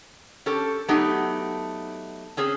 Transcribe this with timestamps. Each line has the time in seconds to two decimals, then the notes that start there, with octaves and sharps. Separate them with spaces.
0.46 C#4 G4 A4
0.88 F#3 A3 B3 D#4 G4
2.37 C4 C#4 G#4